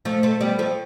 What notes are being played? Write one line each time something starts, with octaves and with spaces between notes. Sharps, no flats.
F3 A3
A3 C4
G3 B3
F3 A3